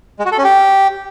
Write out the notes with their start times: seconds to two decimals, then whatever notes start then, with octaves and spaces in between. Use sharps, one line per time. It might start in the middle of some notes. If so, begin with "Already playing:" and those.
0.19 G#3
0.25 F#4
0.32 A4
0.38 C#4
0.44 G4